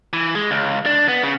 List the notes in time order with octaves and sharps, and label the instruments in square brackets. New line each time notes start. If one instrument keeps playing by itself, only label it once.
[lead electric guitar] E3
G#3
C#2
D4
B3
C#3